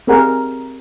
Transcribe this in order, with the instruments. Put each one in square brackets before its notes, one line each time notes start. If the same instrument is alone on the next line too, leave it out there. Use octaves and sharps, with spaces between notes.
[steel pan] C4 G4 G#4 A#4 F#5